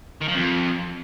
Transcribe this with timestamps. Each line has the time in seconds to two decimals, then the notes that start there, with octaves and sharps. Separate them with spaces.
0.21 D#3
0.28 F3
0.35 F2